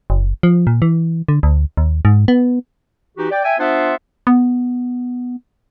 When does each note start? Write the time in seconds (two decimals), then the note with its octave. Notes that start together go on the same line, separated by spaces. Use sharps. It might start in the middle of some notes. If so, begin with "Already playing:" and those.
0.10 F#1
0.43 F3
0.67 A#2
0.82 E3
1.29 D3
1.43 D2
1.77 D#2
2.05 G#2
2.28 B3
3.18 E3 D#4 F#4 G4
3.30 D5 G5
3.44 E5 G5 G#5
3.59 B3 D4 F4 C5 E5 F#5
4.27 B3